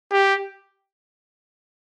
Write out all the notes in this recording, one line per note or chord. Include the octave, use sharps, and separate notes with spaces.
G4